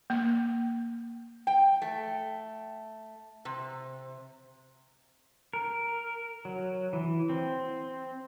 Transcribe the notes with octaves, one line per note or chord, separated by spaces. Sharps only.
A#3
G5
A3
C3
A#4
F#3
E3
C4